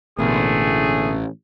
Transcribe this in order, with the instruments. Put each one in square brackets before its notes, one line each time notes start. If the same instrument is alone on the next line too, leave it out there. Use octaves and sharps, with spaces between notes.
[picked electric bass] A1 [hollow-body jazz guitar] B2 D3 A#3 [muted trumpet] A3 [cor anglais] G#4